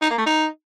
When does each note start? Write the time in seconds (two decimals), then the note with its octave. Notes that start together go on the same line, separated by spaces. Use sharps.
0.02 D#4
0.10 A#3
0.18 A3
0.26 D#4